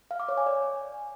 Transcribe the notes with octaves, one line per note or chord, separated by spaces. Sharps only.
F5
D6
C#5
G#5
D5